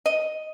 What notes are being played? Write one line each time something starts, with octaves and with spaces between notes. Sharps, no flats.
D#5